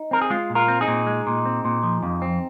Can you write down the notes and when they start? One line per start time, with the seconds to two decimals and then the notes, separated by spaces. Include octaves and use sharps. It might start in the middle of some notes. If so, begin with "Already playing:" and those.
Already playing: D#4
0.11 C4 A#4
0.22 G#4
0.30 G#3 F4
0.50 A#2
0.55 F4 A#4
0.68 C4
0.81 D#4 G#4
0.88 A#2
1.07 G#3
1.27 A#2
1.46 C4
1.65 A#2
1.83 F3
2.03 F2
2.22 C4